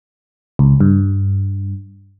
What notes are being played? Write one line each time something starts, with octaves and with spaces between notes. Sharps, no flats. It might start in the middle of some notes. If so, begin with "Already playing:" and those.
C#2
G2